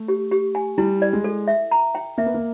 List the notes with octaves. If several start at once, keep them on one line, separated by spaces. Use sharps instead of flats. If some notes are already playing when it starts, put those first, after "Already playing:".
Already playing: A3
G4
G4
G#5
G3 E4
D5
G#3
A4
E5
A#5
G5
A#3 E5
B3
A#3